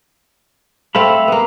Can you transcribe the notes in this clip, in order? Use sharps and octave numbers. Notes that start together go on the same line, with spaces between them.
A3 C4 E5 F5 B5
A#3 B3